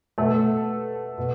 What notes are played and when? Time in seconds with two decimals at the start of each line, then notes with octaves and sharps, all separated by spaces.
0.18 B2 A3 A4
1.18 B2